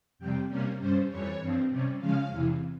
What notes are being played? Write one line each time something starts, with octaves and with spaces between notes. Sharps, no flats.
F2 C3 G3 G5
C3 G3 A#3 C#4 A#4
G2 G3 C#4 C5
F2 E3 G3 C#5
G2 F3 C4
C3 G3 C#4
C#3 F3 G#3 C#4 F5
E2 C3 E3